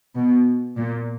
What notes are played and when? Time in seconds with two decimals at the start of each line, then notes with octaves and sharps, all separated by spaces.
0.15 B2
0.77 A#2